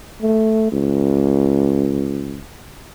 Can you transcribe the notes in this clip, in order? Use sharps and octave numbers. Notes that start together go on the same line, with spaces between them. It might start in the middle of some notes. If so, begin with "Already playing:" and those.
A3
C#2